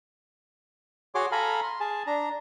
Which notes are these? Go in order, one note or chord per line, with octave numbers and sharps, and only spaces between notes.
F#4 G#4 C#5 C6 D6
A4 F5 G#5 A#5 B5
C6
G#4 G#5 A5
D4 A#5